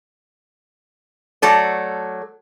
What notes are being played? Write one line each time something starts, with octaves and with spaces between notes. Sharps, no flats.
F#3 A3 A4 D5